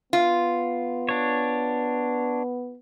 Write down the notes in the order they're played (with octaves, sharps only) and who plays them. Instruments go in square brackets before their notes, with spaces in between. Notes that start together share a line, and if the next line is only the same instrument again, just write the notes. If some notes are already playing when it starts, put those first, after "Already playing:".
[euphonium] B3 [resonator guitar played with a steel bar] F4
[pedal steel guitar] D4 C#5